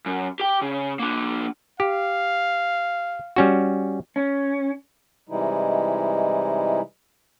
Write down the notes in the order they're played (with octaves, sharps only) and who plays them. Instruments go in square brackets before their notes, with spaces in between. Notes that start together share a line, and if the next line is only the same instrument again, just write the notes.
[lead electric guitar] F#2
G4 G5
C#3
A#3 D4
[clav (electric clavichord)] G4 [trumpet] F5
[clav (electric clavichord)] G3 C#4 F#4
[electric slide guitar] C#4
[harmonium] C3 E3 G3 G#3 D#4 E4